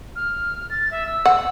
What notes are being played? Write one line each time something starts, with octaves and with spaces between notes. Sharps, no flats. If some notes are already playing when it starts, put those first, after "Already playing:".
F6
A6
E5
E6
F#5